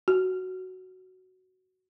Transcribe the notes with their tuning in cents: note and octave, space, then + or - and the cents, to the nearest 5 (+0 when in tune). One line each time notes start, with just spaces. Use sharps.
F#4 +5